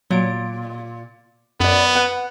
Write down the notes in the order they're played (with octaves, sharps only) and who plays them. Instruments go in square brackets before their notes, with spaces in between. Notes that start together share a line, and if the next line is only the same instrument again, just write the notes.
[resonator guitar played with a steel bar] A#2 [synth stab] F#3 D7
[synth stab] F#2 [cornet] B3 [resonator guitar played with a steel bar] B4 D5
[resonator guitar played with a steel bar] B4 F#5